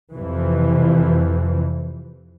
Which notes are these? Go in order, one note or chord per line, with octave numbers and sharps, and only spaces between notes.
F2 C3 E3